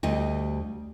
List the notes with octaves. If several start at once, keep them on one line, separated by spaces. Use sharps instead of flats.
D2 G3 D#5